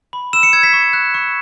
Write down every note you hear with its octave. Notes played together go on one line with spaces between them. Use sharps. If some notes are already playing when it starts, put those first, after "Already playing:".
B5
E6 E7
C#7
E6 G#6
B6
C#6
F#6
C#6